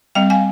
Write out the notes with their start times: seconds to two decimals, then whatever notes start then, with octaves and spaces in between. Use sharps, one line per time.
0.15 G3 C4 D#5 G5
0.30 F5 G#5